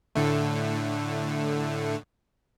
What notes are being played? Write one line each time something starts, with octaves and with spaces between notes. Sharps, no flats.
A2 D3 A3